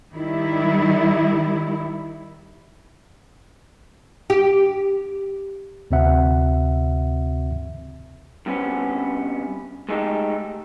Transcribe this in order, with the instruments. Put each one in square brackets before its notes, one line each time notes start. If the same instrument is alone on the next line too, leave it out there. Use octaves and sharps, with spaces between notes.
[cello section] D#3 G3 E4
[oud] G4
[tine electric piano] D2 C3 C4 F#4 E5 F#5
[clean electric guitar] G2 C3 B3 C#4
G#3 A3 D#4 F#4 G4 A4